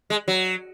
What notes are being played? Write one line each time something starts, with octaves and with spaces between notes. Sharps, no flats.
G#3
F#3